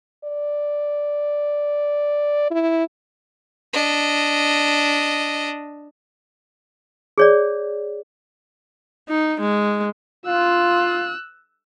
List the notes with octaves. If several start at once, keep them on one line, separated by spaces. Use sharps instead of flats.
D5
E4
D4 D#5
G#4 C#5 D5
D#4
G#3
F4 E6 F#6